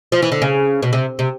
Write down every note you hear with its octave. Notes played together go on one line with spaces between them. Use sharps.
F3
E3
D3
C#3
B2
C3
C3